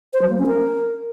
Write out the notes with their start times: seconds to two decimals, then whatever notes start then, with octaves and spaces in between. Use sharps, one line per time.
0.13 C5
0.22 F#3
0.30 A#3
0.38 C#4
0.47 A#4